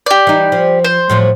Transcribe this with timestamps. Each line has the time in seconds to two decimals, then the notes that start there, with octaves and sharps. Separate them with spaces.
0.06 G4 D5
0.27 E3 D#4
0.52 F3
0.84 C5
1.10 A2 F3 F#3